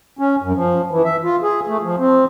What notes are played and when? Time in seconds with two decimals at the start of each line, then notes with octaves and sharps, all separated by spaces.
0.19 C#4
0.42 F#2
0.55 F3
0.91 E3
1.05 E5
1.24 F4
1.42 G#4
1.68 A3
1.83 F3
1.98 C4